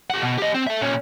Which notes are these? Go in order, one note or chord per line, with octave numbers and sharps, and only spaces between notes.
G4 F#5
B2
G4 D#5
C4
A4 E5
A#2 C#4